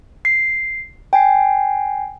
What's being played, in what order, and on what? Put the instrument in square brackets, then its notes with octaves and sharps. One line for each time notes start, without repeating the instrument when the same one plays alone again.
[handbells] C7
G5 G#5 C7